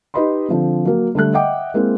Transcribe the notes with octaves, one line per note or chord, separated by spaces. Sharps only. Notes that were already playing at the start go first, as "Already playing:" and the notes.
D#4 G4 B4 D#5 B5 C6
D3 F3 C4
F#3 A#3
D3 G3 A3 F#6
D#5 E5 F#5 G5 D6
G#3 A#3 C4 E4